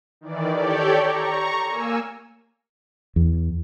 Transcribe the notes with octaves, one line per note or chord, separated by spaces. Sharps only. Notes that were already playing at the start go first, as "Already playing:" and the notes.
D#3 E3 D5
G4 A4 C#5 D5 G6
A#5 C#6
A#3 G#5 E6
E2